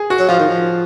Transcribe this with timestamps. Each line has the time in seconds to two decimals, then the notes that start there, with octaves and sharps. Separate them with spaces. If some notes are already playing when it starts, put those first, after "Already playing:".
Already playing: G#4
0.10 F#4
0.19 F#3
0.28 F3 F4
0.40 D#3
0.49 F3